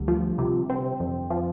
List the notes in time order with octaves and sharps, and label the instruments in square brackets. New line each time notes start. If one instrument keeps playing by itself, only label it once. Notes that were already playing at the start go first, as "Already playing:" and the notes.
Already playing: [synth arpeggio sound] D2 [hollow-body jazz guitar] D3 G3
[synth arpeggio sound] F3
C3
C4
F2
F3